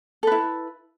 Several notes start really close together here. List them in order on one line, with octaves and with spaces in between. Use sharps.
A4 B4 E4